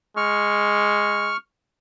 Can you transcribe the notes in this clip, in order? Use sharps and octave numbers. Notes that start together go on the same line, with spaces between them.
G#3 C#6 F6